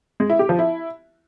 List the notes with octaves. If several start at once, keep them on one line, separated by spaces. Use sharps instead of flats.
G#3
E4
G4
F3
E4